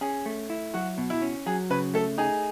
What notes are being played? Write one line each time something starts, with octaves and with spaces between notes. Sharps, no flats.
C#4 G#4
A3
E4
F#3 F#4
B2
E4
C#4
F#3 G#4
C#3 B4
A3 A4
D#4 G#4